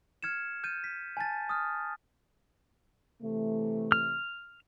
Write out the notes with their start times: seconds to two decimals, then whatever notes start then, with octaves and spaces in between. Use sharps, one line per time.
0.23 F6 G#6 C#7 E7
0.64 F6 G6 A6 D#7
0.84 B6
1.17 G#5 A5 A6
1.49 D#6 F6
3.22 C3 E3 A3
3.92 F6